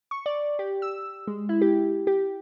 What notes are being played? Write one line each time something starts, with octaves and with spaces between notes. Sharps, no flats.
C#6
D5
G4
E6
G#3
E4
G4
G4